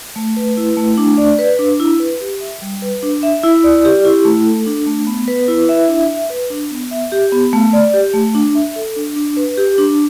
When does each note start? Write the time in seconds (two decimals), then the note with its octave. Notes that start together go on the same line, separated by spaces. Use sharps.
0.16 A3
0.37 B4
0.57 E4
0.77 A3
0.97 D4
1.18 D5
1.39 B4
1.59 D4
1.80 E4
2.00 B4
2.21 G4
2.41 E5
2.62 G3
2.82 B4
3.02 D4
3.23 E5
3.43 E4
3.64 D5
3.85 G4
4.05 E4
4.25 A3
4.46 A4
4.66 D4
4.86 A3
5.07 B3
5.28 B4
5.48 E4
5.69 E5
5.88 D4
6.09 E5
6.30 B4
6.50 D4
6.71 B3
6.91 E5
7.12 G4
7.32 B3
7.53 A3
7.73 D5
7.94 G4
8.14 A3
8.34 D4
8.55 E5
8.76 A4
8.96 D4
9.16 D4
9.37 B4
9.58 G4
9.78 D4